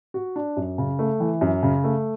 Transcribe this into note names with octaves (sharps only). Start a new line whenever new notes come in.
F#4
D4
F#2
C#3
A3
E3
F#2
C#3
A3